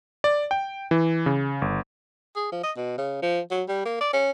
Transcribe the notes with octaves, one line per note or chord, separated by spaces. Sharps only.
D5
G5
E3
C#3
G1
G#4
F3
D#5
B2
C#3
F3
F#3
G3
A#3
D5
C#4